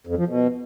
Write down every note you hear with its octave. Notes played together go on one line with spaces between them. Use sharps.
F2
F3
B2